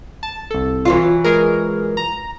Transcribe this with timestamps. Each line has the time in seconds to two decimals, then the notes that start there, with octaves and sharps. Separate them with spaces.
0.23 A5
0.51 C2 A4
0.85 E3 F#3 F4
1.24 G#3 G#4 A#4
1.97 A#5